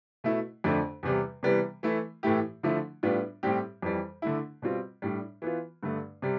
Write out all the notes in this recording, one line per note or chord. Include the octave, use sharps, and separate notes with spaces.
B2 A3 E4
F2 D3 A3 D4
E2 C3 G3
C3 E3 G3 B3
E3 A3 E4
A2 E3 A3 E4 G4
D3 F3 A3 E4
A2 G3 B3 D4 F4
A2 G3 C4 G4
F2 E3 G3
D3 A3 E4
B2 G3 C4 F4
A2 G3 D4
E3 B3 F4
G2 D3 A3
C3 G3